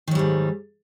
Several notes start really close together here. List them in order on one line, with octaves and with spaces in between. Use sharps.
D#3 F#3 G3 G#2